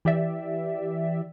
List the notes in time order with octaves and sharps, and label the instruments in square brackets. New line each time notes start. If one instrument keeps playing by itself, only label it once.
[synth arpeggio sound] E3 G4 D5 E5